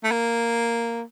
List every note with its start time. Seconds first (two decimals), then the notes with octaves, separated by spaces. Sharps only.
0.04 A3
0.12 A#3